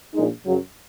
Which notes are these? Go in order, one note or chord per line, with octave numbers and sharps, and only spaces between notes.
A#1 A#2 G#3 D#4
F#2 C#3 F#3